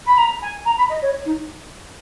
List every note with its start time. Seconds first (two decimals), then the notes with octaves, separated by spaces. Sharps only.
0.06 B5
0.17 A#5
0.41 G#5
0.65 A#5
0.77 B5
0.89 D#5
1.02 C#5
1.25 D#4